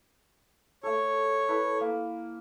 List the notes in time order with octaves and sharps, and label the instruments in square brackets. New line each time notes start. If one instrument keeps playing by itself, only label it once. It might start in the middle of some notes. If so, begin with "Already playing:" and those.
[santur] A3 A4 [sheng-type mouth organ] C#5
[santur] E4 A4 B4
A#3